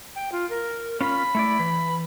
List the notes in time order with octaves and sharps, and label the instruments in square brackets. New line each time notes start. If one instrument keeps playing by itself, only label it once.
[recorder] G5
F4
A#4
[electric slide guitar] C#4 F4 [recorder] B5
[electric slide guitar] A3 E4 D5
E3